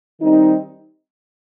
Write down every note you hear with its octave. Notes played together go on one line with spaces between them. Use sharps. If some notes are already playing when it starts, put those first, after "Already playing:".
D#3 G3 C4 D#4